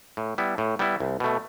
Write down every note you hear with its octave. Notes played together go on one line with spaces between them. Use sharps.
A2
G3 B3 E4
A2
G3 B3 E4
C2
B2 A3